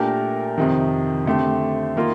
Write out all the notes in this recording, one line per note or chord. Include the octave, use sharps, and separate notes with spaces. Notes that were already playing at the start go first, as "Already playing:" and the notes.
Already playing: A#2 A3 D4 G4 A#4
F2 C3 D#3
D3 A3 C4 G4
D#3 A#3 F4